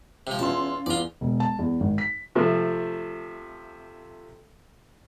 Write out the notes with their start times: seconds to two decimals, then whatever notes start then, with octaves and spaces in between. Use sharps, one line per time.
0.27 C3 F3
0.39 E2 C#4 F4 A5 C6
0.86 E2 F4 D5
1.21 E1
1.40 A5
1.59 E2
1.80 G#1
1.98 B6
2.35 C3 F3 A3